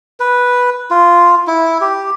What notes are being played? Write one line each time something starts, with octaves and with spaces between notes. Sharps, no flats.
B4
F4
E4
G4